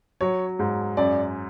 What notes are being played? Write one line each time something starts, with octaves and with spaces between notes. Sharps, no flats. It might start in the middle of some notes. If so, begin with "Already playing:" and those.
F#3 C#5
G#2
F#2 D5